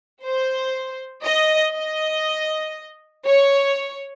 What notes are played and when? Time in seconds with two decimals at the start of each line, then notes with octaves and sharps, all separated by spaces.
0.25 C5
1.24 D#5
1.75 D#5
3.25 C#5